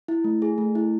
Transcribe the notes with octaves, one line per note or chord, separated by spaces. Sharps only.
E4
A3
G#4
A3
E4